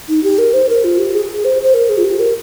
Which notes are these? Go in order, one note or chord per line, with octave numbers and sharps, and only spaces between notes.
D#4
G4
A#4
C5
A#4
F4
G4
G#4
C5
C5
A#4
G#4
F4
G4
A#4